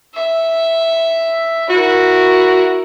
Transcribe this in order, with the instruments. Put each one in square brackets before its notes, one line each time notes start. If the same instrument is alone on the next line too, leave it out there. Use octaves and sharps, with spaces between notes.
[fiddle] E5
[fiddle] E4 A#4 [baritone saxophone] F#4